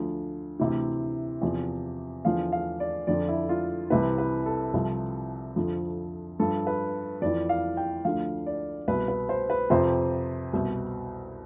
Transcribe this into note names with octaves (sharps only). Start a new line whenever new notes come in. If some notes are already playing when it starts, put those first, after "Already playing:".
Already playing: D2 D3 F3
D2 C3 E3
E2 C3 F3
E2 D3 F3 F5
F5
D5
F2 D3 F3 D5
E4
F4
C2 C3 E3 B4
B4
A4
C2 C3 F3
F2 D3 F3
G2 F3 A4
B4
F2 E3 D5
F5
G5
D2 D3 F3 F5
D5
C2 B2 B4
B4
C5
B4
F2 C3 F3 C5
C2 B2